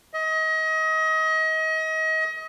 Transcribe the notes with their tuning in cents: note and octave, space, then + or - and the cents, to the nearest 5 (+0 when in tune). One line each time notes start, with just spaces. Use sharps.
D#5 +30